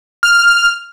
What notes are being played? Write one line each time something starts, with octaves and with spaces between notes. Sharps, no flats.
F6